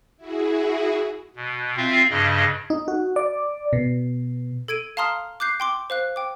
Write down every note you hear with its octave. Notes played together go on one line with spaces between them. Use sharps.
E4 F#4 G#4
B2
C4 F4 E5 F5
G2 C#3 D#5
D#4
F#4
D5
B2
A4 G#6 D7 D#7
F5 A5 A#5 C6 D#6 F6
D6 F#6 G6 C7
G5 C6 D6
C5 F5 F#6
G5 D6